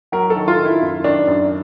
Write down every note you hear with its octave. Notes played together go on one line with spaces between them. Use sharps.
F#3 A#4
A4
D#3
F4
D#3
E4
F#2
D#3 D4
F#2